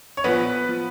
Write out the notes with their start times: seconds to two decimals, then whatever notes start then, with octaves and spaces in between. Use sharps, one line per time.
0.17 C#5
0.24 A#1 A#2 F3 B3 B4
0.69 F3